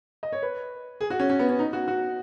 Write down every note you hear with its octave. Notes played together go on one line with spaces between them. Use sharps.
D#5
C#5
B4
G#4
F#4
C#4
C#4
B3
C#4
D#4
F#4
F#4